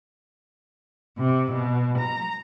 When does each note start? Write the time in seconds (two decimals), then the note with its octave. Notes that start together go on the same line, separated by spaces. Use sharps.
1.18 C3
1.51 B2
1.98 A#5